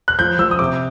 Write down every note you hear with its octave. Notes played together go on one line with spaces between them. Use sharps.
F#6
F3 G6
F3 E6
D#6
C3 D6